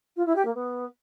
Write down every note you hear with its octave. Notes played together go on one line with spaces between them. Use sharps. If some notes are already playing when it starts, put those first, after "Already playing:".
F4
E4
G4
A#3
B3